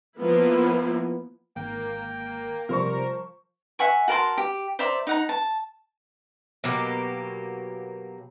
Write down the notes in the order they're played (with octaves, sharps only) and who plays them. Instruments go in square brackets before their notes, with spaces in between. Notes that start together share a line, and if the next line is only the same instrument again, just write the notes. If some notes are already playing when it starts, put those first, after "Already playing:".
[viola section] F3 A#3 B3 E4
[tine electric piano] G#1 [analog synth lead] A#3 [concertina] G5
[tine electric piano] C3 G3 [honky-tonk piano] F3 C5 C#6 [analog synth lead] A#4
[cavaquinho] E5 F#5 G#5 C#6
F#4 A#4 A5 C6
G4
C5 D5 E5 A#5
D#4 F#5 A#5
A5
[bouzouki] B2 F#3 A#3 G4